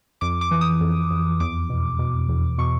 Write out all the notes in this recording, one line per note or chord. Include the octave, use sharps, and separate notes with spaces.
F2 D6
D6
E3
D#6
F2
F2
E2 D6
B2
B2
E2
B2 C#6